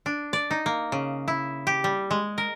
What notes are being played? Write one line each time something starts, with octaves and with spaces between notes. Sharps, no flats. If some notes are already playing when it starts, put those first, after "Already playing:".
D4
D5
D#4
A#3
C#3
E4
G4
G3
G#3
A#4